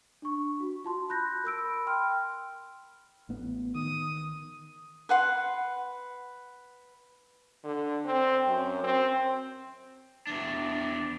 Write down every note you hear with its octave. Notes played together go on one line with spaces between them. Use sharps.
D4 C#6
F#4
F4 A5 C6
B5 F#6 G6 A#6
A#4 B5 E6 D7
G5 C6 F6
A1 B3
D#3 D#6
B4 F#5 C6
D3
C4
F#2
C4
E2 D4